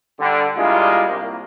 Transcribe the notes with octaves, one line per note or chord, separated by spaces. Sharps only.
D3 G3
G3 G#3 A#3 D4 E4 F4
C2 A#3